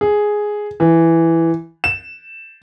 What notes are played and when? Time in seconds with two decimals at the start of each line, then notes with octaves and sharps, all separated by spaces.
0.01 G#4
0.80 E3
1.84 E7